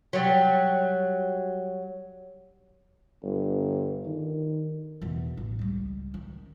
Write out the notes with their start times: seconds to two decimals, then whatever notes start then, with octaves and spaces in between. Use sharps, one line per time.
0.13 F#3 G3
3.23 G1
4.06 D#3
5.02 E2 B2
5.37 A1
5.59 C#2 G3
6.14 D#3